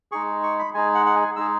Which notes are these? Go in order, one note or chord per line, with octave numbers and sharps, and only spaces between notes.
G#3 D#4 G#4 C#6
C#6
B5
G#3 D#4 G#4 G#5
F#5
F#5
G#5
G#3 D#4 G#4 E6